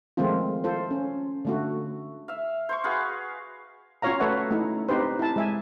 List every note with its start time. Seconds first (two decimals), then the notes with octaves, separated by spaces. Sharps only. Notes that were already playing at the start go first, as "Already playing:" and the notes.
0.17 D#3 F3 G#3 A3 C4 F4
0.64 F4 A4 C5
0.91 C#4
1.45 D3 A3 F#4
2.28 E5 F5
2.69 C5 C6 C#6
2.84 F#4 G#4 B4 F5
4.02 C#4 F4 F#4 C#5 F5 A#5
4.20 A3 A4 B4 C#5 E5 F#5
4.51 A3 C#4 D#4 E4
4.89 C4 D#4 G4 B4 C5
5.19 E4 A5
5.36 G#3 E5 G#5